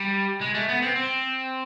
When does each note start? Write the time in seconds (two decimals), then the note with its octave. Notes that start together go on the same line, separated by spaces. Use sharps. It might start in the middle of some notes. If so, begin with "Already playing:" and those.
Already playing: G3
0.41 G#3
0.54 A3
0.69 B3
0.82 C4
0.96 C4